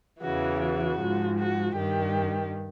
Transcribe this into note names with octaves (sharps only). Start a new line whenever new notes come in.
E2 C#3 E3 F#4
F#4
G#2 F3
F#4
G2 D#3 G4